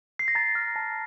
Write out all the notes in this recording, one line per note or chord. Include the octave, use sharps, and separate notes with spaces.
C7
A#6
A#5 A6
F6
A5